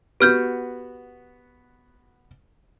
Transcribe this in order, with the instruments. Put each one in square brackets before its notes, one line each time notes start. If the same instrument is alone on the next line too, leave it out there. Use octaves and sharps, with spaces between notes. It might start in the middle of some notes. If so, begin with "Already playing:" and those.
[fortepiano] B3 F#4 [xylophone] G4 F6 G6